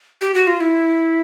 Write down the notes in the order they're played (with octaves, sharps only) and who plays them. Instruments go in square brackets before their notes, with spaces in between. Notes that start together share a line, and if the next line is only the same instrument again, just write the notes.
[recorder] G4
F#4
F4
E4